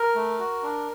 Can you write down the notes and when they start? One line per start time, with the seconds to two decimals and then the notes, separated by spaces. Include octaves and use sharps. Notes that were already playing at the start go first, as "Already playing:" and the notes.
Already playing: A#4
0.15 A3
0.39 F#4
0.63 D4